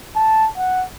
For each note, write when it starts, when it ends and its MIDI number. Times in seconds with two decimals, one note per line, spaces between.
0.16 0.48 81
0.57 0.85 78